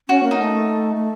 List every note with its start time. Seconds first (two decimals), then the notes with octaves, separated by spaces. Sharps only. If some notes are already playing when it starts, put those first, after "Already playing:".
0.09 C#4 F#4
0.23 A#3
0.31 D#4
0.38 A3
0.96 A3